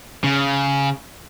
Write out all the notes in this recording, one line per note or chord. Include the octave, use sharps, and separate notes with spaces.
C#3